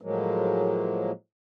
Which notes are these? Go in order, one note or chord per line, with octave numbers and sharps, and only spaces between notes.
A2 F3 F#3 G#3 A#3